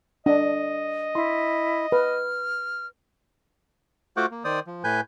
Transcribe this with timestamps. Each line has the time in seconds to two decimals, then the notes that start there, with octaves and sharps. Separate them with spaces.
0.26 D4 D#5
1.15 E4 C6
1.92 B4 F6
4.17 A3 F4 F#4 C5 F#5 D6
4.31 A#3
4.44 D#3 C5 D5 D#6
4.67 F3
4.84 A2 B4 G#5 G6